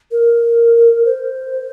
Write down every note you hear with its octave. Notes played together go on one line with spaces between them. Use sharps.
A#4
C5